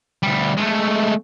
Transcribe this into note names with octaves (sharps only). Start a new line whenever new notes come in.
D2 G3
G#3 A3